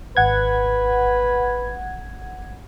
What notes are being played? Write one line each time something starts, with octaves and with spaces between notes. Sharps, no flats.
G#1 B4 F#5 G#6